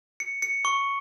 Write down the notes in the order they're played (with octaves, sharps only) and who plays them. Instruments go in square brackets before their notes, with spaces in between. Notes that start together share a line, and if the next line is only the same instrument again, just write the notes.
[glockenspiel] C#7
C#7
C#6